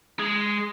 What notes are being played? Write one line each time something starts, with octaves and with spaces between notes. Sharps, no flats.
G#3